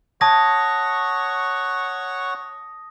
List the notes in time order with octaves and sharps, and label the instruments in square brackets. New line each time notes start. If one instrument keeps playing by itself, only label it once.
[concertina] C#5 F#5 C#6 [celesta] A5 G#6 [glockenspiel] D#6 A#6